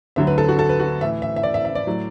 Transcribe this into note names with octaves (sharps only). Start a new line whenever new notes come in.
D2 D3 F#3 E5
B4
A4
F#4
A4
B4
F#4
A2 E3 E5
E5
E5
D5
E5
E5
D5
A2 F#3